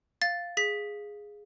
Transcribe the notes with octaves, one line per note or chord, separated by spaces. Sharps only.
F5 A6
G#4 B6